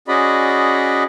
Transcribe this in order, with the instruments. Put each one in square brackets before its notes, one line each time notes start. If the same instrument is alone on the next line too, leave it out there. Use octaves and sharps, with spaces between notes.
[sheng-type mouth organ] C#4 F#4 G#4 D5 D#5 B5